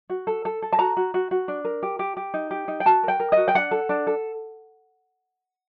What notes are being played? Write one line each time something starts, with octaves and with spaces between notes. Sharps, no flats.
F#4
A4
A4
A4
A5
F#4 A#5
F#4
F#4
F#4
D4
A#4
G4
G4
G4
D#4
G4
D#4
G5
F#4 A5
A#4 G5
A#4
F#4 D#5
G5
D4 F#5
A4
D4
A4